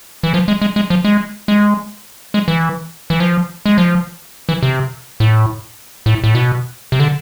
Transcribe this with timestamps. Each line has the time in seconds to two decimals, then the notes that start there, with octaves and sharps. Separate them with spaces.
0.23 E3
0.34 F3
0.48 G#3
0.62 G#3
0.76 G#3
0.90 F3
1.04 G#3
1.48 G#3
2.34 G#3
2.48 E3
3.10 E3
3.20 F3
3.66 G#3
3.78 F3
4.49 E3
4.63 C3
5.20 A2
6.06 A2
6.24 A2
6.35 B2
6.92 C3
7.00 D3